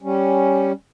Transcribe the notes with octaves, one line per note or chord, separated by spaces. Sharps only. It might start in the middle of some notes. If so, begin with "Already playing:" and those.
G3 C#4